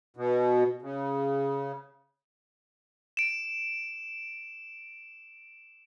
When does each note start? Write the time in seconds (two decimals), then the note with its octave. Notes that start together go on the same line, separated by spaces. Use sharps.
0.17 B2
0.82 C#3
3.17 D7 E7